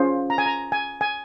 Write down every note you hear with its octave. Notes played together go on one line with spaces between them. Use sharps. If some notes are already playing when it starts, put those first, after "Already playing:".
Already playing: C#4 F4 G#4 C5
A#5
G#5
A#5
G#5
G#5